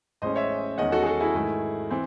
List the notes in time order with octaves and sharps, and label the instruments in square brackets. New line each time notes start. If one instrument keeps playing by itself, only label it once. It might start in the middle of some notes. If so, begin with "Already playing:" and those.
[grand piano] A1 A2 G#3 C#4 C5 D#5
C#5 E5
E2 D#3 G#3 C#4 D#5 F#5
F#4 A4
G#4
F#4 A4
E4 G#4
G#2 D#3 A3
E3 C4